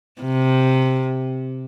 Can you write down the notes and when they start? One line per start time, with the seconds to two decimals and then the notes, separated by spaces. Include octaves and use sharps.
0.21 C3